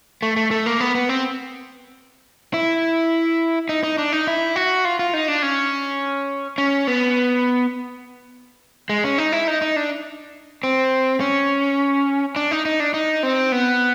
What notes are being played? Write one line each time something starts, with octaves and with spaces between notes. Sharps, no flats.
A3
A3
A3
A#3
B3
B3
C4
E4
D#4
D#4
D4
D#4
E4
F#4
F4
F4
D#4
D4
C#4
C#4
B3
G#3
C#4
D#4
E4
D#4
D#4
D4
C4
C#4
D4
D#4
D#4
D4
D#4
C4
B3